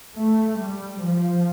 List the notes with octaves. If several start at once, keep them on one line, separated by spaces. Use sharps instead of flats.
A3
G3
F3